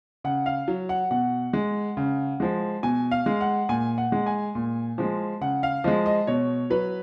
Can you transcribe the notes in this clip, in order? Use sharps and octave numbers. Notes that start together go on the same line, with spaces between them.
C#3 F#5
F5
F#3
F#5
B2 F#5
G#3
C#3
F3 G#3
B2 G#5
F5
G#3
F#5
A#2 G#5
F#5
G#3
G#5
A#2
F3 G#3
C#3 F#5
F5
F3 G#3 D#5
D#5
B2 C#5
F#3 B4